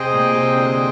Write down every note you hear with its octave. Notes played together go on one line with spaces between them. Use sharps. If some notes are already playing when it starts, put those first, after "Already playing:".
Already playing: C3 G#4 C5 D#5 G5
A#2
C3
D3